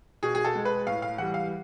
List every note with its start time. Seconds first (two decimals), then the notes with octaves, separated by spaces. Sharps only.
0.23 B2 G#4
0.35 G#4
0.45 A4
0.55 G#3
0.65 B4
0.87 A2 F5
1.02 F5
1.18 E3 G3 F#5
1.34 F5